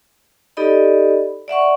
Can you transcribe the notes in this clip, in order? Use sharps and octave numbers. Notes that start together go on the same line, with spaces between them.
D#4 G4 A4 D5 D#5 B5
D5 E5 F#5 C#6